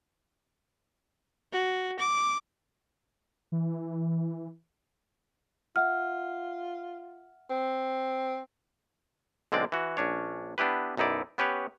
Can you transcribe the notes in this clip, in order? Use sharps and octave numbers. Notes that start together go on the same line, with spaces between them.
F#4
D6
E3
F4 E5 F#5 F6
C4
B1 D3 G#3 C4 D5
E3 F#4
A#1 C#4 D4 C#5
B3 D4 E4 G4 B4
B1 F#2 D#4 E4 D5
B3 C#4 G4 B4 C#5